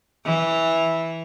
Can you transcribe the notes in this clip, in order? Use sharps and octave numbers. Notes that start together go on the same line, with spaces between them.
E3